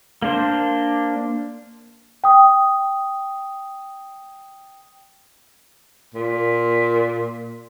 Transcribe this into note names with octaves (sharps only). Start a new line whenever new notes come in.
A#3 D4 C5
G5 D#6
A#2